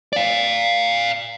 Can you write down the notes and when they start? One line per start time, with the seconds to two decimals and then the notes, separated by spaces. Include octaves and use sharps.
0.13 D5 F5